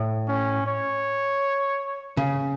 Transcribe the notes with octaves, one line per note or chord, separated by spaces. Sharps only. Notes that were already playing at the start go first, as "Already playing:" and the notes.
Already playing: A2
C#4
C#5
C#3